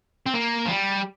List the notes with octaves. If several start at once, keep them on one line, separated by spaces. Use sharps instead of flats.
C4
A#3
F3
G3